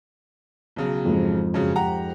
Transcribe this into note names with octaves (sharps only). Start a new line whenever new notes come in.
B1 C#3 F#3
F2 G#2
F#2 C#3
G4 F#5 A#5